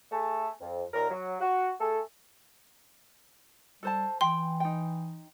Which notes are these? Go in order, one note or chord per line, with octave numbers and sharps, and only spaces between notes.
A3 G#4 A5
F2
D#2 A#2 A#4
F#3
F#4
A3 G#4 A4
G3 A4 C5 A5
E3 G5 C6
D#4 G5